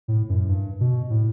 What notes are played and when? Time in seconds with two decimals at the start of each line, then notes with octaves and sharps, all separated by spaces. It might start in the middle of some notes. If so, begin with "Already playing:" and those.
0.08 A2
0.29 F#2
0.49 G2
0.80 B2
1.10 A2